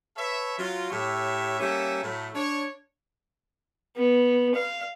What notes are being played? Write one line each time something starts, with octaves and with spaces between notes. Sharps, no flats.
A4 B4 C#5 E5
F#3 F4
A2 G4 C#5 E5
G3 A#3 C#4 A4 E5
A2 F#3 A3
D4 C#5
B3
F5